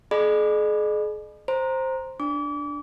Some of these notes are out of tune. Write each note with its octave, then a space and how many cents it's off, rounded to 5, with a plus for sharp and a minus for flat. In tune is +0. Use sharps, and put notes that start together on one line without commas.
G#4 +40 D#5 -45 B5 +0
C5 +5 A#5 +0
D4 +0 D6 -35